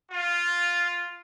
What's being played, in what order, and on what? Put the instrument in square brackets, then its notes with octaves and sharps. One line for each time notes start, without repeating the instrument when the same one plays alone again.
[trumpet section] F4